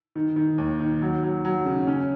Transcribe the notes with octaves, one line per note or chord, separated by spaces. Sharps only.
D#3
D#3
D#2
D#3
F#3
F#3
F#3
C#3
C#4